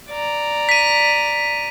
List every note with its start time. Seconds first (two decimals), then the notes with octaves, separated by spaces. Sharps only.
0.10 D5 A#5
0.69 B6 D#7